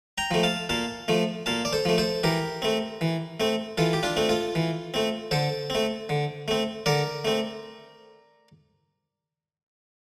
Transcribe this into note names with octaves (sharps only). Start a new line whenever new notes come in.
G5 A#5
F3 A3
F5 A5
A#2 F5 A5
F3 A3
A#2 F5 A5
D5
A4 C5
F3 A3
A4 C5
E3 G4 A#4
A3 C4
E3
A3 C4
E3 F4 A4
G4
D4 F4
A3 C4
F4 A4
E3
A3 C4
D3 A4 C5
A3 C4
D3
A3 C4
D3 A#4 D5
A3 C4